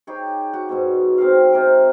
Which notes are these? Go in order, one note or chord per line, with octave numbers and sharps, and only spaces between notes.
D#4 G4 G#4 C#5
F#4
G#2 B2 C#5
C4 G#4 A#4 F5
C3 A#4